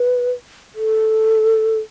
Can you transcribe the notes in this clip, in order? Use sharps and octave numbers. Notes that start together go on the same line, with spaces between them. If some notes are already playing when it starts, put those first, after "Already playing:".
Already playing: B4
A4